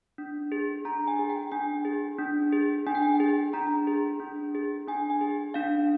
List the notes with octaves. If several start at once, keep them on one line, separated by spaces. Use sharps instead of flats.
D4
G#4
D4 A#5
G#5
G#4
G5
D4 G#5
G#4
D4
G#4
D4 G#5
G5
G#5
G#4
D4 A#5
G#4
D4
G#4
D4 G#5
G#5
G#4
D4 F5